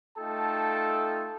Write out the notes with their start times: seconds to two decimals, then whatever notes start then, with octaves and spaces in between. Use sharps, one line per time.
0.18 A3 D#4 F4 A4 G5 A5